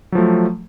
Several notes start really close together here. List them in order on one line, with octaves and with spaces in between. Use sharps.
F#3 F3 A3